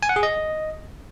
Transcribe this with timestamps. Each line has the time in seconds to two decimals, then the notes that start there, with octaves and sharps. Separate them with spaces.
0.03 G#5
0.09 F#5
0.16 G#4
0.23 D#5